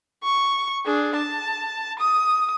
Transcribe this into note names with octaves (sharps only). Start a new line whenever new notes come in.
C#6
D4 G#4
A5
D#6